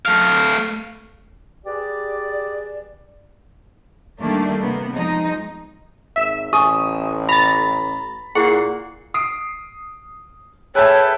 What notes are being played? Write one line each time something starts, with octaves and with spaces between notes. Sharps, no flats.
A3 F5
G4 G#4 B4 D5
D#3 G3 A3 A#3 D4
C3 A#3 B3
F3 G#3 D#4
G#1 E5 E7
A1 G4 G#5 C#6 D#6
A#5 B5 A6
A#2 E4 G#4 F#5 C#6 C7
D#6 C7 D7
G#4 A4 B4 C#5 E5 G5 A5